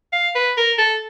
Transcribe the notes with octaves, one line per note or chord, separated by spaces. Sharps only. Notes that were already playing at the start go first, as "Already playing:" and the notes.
F5
B4
A#4
A4